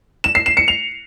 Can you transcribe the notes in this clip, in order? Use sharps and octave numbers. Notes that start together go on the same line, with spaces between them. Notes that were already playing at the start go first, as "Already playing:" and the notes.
E7
C7
E7
C#7
F7